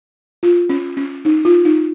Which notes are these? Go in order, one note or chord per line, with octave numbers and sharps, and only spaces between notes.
F4
C#4
C#4
D#4
F4
D#4